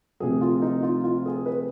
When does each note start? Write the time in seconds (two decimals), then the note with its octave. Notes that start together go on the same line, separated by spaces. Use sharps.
0.20 D2 C3 F3 G#4
0.41 F4
0.62 D#4
0.83 F4
1.04 F4
1.26 G#4
1.46 B4